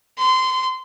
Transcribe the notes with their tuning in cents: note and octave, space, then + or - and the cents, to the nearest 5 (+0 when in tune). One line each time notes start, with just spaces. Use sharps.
C6 -25